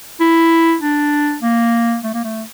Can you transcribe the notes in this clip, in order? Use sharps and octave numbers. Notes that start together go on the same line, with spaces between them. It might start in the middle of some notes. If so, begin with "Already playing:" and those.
E4
D4
A#3
A3
A#3
A3